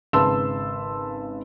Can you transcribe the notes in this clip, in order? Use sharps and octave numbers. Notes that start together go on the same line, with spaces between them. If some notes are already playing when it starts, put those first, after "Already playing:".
G#1 C#3 B4 A5 C6 E6